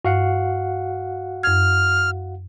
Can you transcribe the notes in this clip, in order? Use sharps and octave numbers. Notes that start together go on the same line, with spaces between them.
G2 F#4 F5 F#5
F#2 F6 G#6